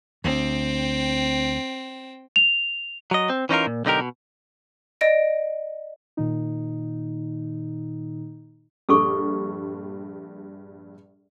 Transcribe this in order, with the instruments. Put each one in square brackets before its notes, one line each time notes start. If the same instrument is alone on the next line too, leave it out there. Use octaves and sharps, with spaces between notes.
[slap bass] D2 [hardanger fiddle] C4 G5
[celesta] F7
[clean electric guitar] F#3 D#5
C4
E3 C#4 D#4 F4 A#4
A#2
B1 D3 D#4 G4 A#4
B2
[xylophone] D5 D#5 A#6 D7
[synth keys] A#2 D#3 D#4
[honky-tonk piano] A#1 G2 [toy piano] G#4 A4 C#6